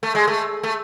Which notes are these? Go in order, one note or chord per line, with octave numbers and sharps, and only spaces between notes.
A3
G#3
A3
A3